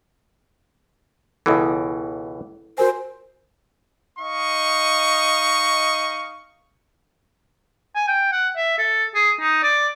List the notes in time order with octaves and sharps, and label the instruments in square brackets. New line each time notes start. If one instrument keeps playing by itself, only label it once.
[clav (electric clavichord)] C#2 B2 E3 [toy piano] E4 B5 D#6 [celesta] A4
[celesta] F#4 A#4 G#5 [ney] C5
[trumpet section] D#4 D#5 F5 C#6
[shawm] G#5
G5
F#5
E5
A4
G#4
D#4
D5